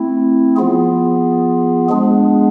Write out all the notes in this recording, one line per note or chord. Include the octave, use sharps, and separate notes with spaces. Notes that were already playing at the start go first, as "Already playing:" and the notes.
Already playing: A3 C4 E4
F3 B3 F4 G#4
G#3 B3 D4 G#4